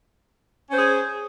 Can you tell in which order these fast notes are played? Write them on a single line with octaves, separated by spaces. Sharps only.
C#4 C5 G#4